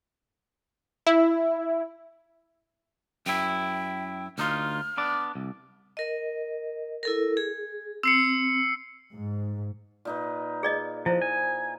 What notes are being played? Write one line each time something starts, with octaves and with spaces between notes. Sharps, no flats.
E4
F#2 E4 G5
D2 D#4 F4 F6
B3 D4 D5
C2
A#4 D#5
E4 A4 A#4
G#4
C4 E6 C7 C#7
G#2
A#2 D#4 B4
G#4 D5 D#5
F3 E4 C5
G#5